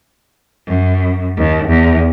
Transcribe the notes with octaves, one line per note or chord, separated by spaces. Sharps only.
F#2
D#2
E2